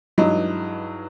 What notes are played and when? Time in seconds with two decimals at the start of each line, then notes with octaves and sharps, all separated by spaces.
0.18 G2 E3 F#3 G#3 D#4